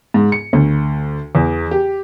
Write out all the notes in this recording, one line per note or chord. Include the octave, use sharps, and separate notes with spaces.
G#2
C#7
D2
E2
G4